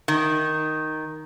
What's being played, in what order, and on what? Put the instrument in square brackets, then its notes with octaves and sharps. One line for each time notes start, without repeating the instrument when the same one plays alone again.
[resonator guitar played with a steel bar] D#3